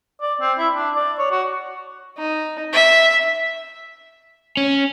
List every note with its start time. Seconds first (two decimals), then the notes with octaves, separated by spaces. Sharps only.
0.22 D5
0.41 C4
0.58 E4
0.75 D4
0.95 D5
1.19 C#5
1.32 F#4
2.18 D#4
2.73 E5
4.57 C#4